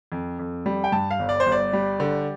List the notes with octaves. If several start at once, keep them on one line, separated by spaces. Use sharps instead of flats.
F2
F2
G3
G5
G2 A5
F5
G1
D5
C5
G1
D5
G3
D3